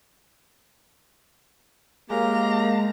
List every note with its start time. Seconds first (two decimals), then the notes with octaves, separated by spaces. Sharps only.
2.10 F#3 G#3 A#3 G4 F5 A#5